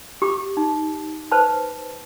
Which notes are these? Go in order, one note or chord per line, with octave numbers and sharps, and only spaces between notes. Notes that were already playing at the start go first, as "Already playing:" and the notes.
G4 B5 D6
D#4
B4 C5 A5 B5